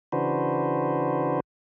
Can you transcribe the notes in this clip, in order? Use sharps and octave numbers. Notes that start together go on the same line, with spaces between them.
C#3 E3 D4 F#4 B4 C5